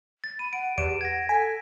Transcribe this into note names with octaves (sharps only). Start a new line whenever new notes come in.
A6
B5 D#7
F#5 D7
E2 G4 D7 E7
F#5 G#6 A#6
A4 G#5 B6